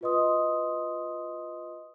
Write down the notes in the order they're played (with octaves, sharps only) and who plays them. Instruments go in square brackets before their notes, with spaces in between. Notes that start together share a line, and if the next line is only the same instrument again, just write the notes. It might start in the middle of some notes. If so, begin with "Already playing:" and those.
[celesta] F4 F#4 B4 D#5 C6 D#6